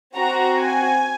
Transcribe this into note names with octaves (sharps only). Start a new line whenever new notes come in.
C4 F#4 A#5
G#5